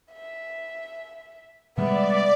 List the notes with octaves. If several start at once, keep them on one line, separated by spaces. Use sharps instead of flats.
E5
C3 G3 G#3 B3 D5 E5